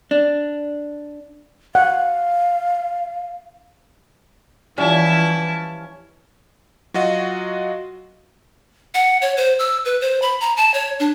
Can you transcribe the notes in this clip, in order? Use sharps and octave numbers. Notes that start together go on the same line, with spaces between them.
D4
F5 F#5
E3 F3 G3 C#4 E4 A5
F#3 F4 F#4 D#5
F#5
C#5
C5
E6
B4
C5
B5
A#5
A5
C#5
D4